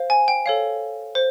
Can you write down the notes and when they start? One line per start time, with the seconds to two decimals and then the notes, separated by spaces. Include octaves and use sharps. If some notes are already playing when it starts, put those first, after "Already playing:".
Already playing: C5 F5
0.10 G#5
0.28 G5
0.46 A4 C#5 F5
1.15 C5